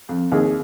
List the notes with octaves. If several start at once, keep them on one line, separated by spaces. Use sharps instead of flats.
F2
D#2 G#4